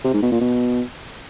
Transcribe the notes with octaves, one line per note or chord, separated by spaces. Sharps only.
C3
G#2
B2
A#2
B2